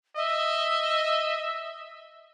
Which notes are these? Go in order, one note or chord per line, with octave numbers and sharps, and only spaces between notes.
D#5 E5